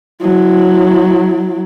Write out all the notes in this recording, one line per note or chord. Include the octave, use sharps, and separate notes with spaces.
F#3 E4